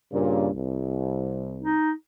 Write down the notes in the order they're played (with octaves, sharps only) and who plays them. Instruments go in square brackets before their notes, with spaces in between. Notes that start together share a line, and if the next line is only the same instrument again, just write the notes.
[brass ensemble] G2 A#2 C#3
C2
[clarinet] D#4